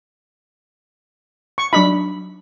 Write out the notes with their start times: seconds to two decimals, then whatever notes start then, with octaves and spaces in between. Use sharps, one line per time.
1.58 C#6
1.73 F#3 D4 D#4 B5